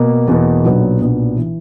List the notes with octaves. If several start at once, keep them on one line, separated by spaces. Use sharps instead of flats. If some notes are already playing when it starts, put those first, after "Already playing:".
Already playing: B2 A#3
E2 B2 A#3
B1 A#2 F#3 B3 D4
B1 A#2 F#3 B3 D4
E3